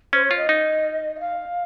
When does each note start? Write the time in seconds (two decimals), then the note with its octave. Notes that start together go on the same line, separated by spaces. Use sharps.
0.13 C#4 C5
0.25 C#5
0.31 F4
0.37 D#5
0.49 D#4
1.16 D#5
1.20 F5